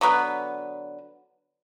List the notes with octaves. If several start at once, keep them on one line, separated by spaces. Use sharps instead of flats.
D3 F#3 B3 B4